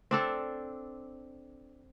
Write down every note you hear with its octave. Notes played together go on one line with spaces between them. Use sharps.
C4 D4 A4